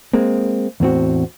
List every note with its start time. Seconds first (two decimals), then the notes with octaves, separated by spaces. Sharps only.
0.14 G#3 A#3 C4
0.80 E2 A2 C4 F#4